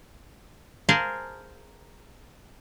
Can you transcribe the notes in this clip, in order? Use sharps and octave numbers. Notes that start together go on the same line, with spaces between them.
G#4 A#4 C5 F5 G#5 A5